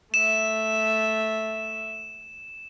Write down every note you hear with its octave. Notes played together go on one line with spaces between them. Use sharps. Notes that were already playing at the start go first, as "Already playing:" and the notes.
A3 E5 E7